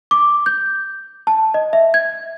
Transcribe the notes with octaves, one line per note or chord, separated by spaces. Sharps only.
D6
G6
A5
D#5
E5
G#6